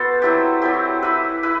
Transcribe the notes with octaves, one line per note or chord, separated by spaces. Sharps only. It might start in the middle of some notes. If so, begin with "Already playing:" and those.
Already playing: B3 F#4 A4 C5
F#3 C4 E4 G4
F#3 C4 E4 G4
E4 B4 E5
E4 B4 E5